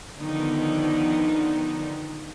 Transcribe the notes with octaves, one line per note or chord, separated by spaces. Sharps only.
D3 D#3 F3 B3 D#4